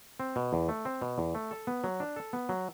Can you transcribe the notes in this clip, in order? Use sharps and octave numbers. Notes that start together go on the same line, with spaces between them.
C4
B2
E2
A3
C4
B2
E2
A3
A4
B3
F#3
D4
A4
B3
F#3